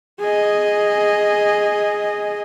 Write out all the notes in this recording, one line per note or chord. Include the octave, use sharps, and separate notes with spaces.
G#4 D#5